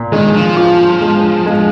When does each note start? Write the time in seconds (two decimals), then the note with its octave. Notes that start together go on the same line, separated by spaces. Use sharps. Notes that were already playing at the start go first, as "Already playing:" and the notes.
Already playing: A#2
0.12 D#3 G#3
0.34 F3
0.57 F4
1.02 G#3
1.46 G#3